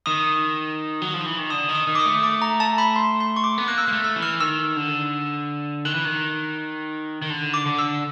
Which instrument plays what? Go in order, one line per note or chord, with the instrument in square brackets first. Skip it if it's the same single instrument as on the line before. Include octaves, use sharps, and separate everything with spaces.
[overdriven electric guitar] D#3 [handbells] D#6
[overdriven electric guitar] F#3
F3
E3
D#3
[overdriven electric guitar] D3 [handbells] D#6
[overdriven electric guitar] D#3
[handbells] D#6
[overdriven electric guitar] D#3
[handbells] D6
D#6
[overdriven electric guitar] A3
[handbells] D6
A#5
A5
B5
C6
C6
C#6
D6
[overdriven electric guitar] B3
[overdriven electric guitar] A#3 [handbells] F#6
[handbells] E6
[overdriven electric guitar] A#3 [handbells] F6
[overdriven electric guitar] A3
[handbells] E6
[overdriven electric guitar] E3
[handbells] F6
[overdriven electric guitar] D#3 [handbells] E6
[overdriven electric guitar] D3
[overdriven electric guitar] D#3 [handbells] F#6
[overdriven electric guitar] E3
D#3
D#3
D3
[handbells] D6
[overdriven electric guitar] D3
[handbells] E6